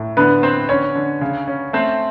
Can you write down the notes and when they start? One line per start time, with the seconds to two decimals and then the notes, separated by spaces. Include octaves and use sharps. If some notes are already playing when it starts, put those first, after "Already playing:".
Already playing: A2
0.17 D3 B3 B4
0.43 B3 C4 C5
0.69 D3 C#4 C#5
0.95 D3
1.21 C#3
1.47 C#4
1.73 A3 C4 C5